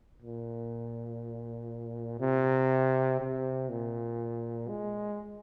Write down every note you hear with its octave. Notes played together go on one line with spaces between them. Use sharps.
A#2
C3
C3
A#2
G#3